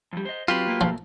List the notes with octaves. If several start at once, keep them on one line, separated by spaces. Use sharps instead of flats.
F2 G3
C5 D#5
F#3 C4 F4 G4 B4
F#3 A3 A#3
F3